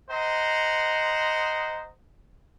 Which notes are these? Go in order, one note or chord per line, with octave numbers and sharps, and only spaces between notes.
C5 D#5 F#5 A#5 C6